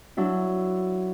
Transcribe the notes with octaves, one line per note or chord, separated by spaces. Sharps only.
F#3 D4 E4